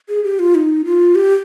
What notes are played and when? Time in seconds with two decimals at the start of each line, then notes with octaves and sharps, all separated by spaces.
0.09 G#4
0.24 G4
0.39 F4
0.55 D#4
0.85 F4
1.15 G4